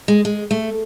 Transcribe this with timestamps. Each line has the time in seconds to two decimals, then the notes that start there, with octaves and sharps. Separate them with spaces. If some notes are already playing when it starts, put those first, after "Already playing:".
0.08 G#3
0.25 G#3
0.51 A3